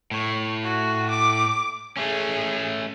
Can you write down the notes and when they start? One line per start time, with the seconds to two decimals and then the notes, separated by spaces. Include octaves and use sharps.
0.11 A2 C#5
0.63 F#4
1.10 D6
1.97 A3 C#4 G#4